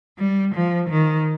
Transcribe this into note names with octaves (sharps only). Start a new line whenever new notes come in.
G3
F3
D#3